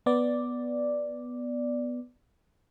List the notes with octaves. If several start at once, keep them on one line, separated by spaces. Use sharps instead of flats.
B3 D5